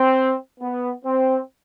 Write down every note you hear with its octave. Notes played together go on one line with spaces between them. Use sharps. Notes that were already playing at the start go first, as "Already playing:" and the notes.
Already playing: C4
B3
C4